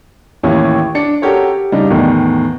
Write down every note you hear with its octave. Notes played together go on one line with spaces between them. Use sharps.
A1 D#2 C#4 E4
D4 C#7
C#4 F#4 G4 A4 A#4 C#5
G4
C#3 G3 D4 D#4
E2 A2 D#3